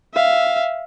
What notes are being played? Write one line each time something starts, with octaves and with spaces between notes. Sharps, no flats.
E5 F5